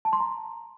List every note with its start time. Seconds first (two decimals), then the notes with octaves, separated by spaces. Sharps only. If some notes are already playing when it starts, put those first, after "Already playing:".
0.05 A5
0.13 C6
0.20 A#5